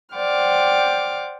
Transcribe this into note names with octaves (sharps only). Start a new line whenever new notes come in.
C5 D5 F#5 G5 D6 F6